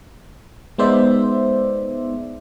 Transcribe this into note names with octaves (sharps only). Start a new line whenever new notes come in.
G#3 B3 D#4 C5 D5 E5